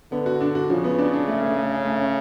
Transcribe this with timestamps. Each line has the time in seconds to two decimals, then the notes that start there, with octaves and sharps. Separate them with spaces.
0.12 D3 B3
0.26 F#4
0.41 D4
0.55 F#4
0.70 C#3 F3
0.84 B3
0.99 D4
1.13 D4
1.28 A3
1.42 A3
1.57 A3
1.71 C#4
1.85 A3
2.00 C#4